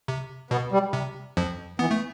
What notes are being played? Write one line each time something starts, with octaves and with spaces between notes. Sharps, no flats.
C3
B2 B3
G3
C3
F2 F3
E3 B3
A3